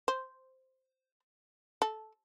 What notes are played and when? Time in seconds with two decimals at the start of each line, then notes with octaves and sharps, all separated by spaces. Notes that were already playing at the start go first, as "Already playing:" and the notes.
0.08 C5
1.82 A4